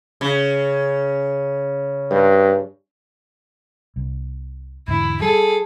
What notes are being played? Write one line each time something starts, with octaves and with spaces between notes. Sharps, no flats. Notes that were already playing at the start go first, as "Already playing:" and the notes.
C#3
G2
C2
E2 G#2 D3 E4
G3 G#4 A4